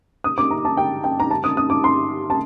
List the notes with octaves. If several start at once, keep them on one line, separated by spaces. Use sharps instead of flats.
D#6
D6
A#5
A5
G5
G5
A#5
A5
D#6
D#6
D6
C6
A5